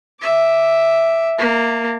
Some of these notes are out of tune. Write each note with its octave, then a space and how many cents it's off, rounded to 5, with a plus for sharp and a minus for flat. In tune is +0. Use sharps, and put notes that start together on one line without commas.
E5 +0 D6 +0
A#3 +0 A#5 -45